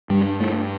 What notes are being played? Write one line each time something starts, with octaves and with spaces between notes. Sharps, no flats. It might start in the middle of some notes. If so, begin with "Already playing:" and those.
G2 G3
A3